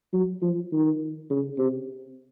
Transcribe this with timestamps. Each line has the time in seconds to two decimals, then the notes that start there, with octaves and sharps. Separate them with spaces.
0.13 F#3
0.42 F3
0.72 D#3
1.30 C#3
1.58 C3